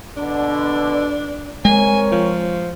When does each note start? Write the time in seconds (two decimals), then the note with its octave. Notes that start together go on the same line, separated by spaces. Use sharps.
0.17 B2 D3 D4
1.65 G#3 C4 A#4 C#5 G#5
2.12 F3